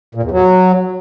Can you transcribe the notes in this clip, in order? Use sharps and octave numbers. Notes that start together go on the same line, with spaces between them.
A#2
E2
F#3